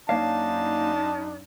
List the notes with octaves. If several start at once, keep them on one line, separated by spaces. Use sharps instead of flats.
F#2 A#3 D4 D#4 C#5 F5 A5